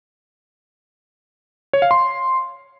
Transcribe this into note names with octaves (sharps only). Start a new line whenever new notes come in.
C#5
F5
C6